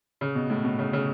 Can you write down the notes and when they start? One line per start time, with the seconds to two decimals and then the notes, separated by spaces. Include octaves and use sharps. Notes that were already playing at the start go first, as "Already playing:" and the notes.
0.21 C#3
0.35 B2
0.50 A2
0.64 B2
0.79 C#3
0.93 C#3